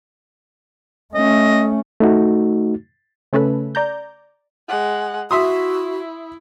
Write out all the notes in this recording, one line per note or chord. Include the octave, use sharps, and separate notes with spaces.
A3 C#4 D#5
A3 D#4 F#4
C#3 A3 C#4 A4 B4
D5 A#5 G6
G#3 F#5
E4 F#4 E5 C6 D#6